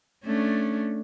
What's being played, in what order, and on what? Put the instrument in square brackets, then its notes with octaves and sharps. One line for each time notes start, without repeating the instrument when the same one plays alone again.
[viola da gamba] A3 C#4 D4